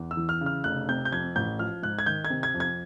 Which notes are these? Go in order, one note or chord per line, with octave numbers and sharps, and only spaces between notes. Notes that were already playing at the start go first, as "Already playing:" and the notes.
Already playing: E2
E6
E3
F6
C#3
F6
F1 F#6
C3 G6
G6
F2 G#6
A1 G6
F3 F6
G#2 F#6
G#6
D#3 G6
G#6
C3
G#6
F2
G#6